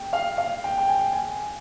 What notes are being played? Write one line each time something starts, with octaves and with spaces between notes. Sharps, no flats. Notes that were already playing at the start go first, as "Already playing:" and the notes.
Already playing: G5
F5
F5
G5
G5
G#5
G#5